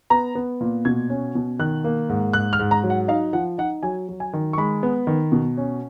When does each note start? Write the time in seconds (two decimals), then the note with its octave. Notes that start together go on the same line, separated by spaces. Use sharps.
0.10 B3 A#5
0.35 B3
0.61 A#2
0.85 B2 G#6
1.10 C#4
1.35 B2
1.59 D#3 F#6
1.84 A#3
2.09 G#2
2.33 G#2 F#6
2.53 F6
2.59 G#2
2.71 A#5
2.83 F#3
2.90 F#5
3.08 D#4 F5
3.33 F3 F#5
3.58 D#4 F#5
3.83 F#3 G#5
4.09 F#3
4.20 G#5
4.33 D#3
4.53 C#6
4.57 G#3 B5
4.83 B3
5.07 D#3
5.32 B2
5.57 C#4